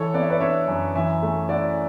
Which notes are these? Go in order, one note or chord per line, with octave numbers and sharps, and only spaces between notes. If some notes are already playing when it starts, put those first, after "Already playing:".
Already playing: E3 A4 C#5
B3 D5
E5
B4 D5
D4 C#5 E5
F#2
E3 E5 G#5
A3
E4 D5 F#5